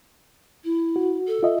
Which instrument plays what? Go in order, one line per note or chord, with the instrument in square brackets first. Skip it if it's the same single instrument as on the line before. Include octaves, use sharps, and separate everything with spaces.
[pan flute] E4
[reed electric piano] F#4
[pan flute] A4
[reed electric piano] F4 D#5 E5